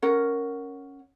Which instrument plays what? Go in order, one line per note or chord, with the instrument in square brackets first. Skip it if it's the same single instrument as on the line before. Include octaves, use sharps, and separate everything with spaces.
[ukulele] C#4 A#4 F#5